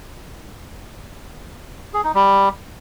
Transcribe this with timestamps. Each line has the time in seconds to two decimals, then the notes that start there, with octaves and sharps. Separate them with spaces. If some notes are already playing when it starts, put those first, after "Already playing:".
1.94 G#4
2.04 D#4
2.14 G3